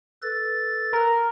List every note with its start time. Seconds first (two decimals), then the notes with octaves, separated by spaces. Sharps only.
0.22 A4 B4 A6
0.93 A#4